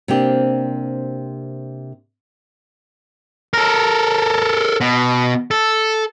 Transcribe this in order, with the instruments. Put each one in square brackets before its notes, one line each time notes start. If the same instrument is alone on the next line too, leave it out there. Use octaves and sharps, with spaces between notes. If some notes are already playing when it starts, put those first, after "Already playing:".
[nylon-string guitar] C3 A#3 C4 D4 G4
[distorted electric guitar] A4 A#4
B2
A4